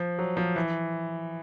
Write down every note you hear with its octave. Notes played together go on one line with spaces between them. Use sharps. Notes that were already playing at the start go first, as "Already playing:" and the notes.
Already playing: F3
F#3
F3
E3